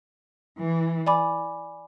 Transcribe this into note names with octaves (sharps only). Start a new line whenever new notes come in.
E3
D5 G#5 B5 D6